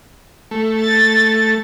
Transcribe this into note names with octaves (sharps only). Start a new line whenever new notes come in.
A3
A6